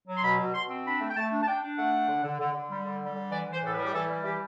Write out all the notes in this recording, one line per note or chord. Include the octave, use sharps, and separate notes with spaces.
F#3
C6
B2 B5
B2
B2 C6
C4
D4 B5
A3
G5
A3 A5
D4
A5
D4 G5
D4
A3 F#5
D4
D3
D3
D3
D3
G3
D3
G3
D3
E3 D5
E3 C5
A2 A4
B4
G3
G4
E3 A4
G3
E3 G4